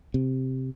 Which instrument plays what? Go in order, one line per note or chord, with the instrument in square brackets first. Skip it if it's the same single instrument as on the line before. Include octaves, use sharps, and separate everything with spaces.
[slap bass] C3